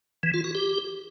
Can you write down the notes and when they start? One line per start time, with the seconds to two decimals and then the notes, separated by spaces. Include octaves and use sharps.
0.23 E3
0.34 F4
0.44 F#4
0.55 G4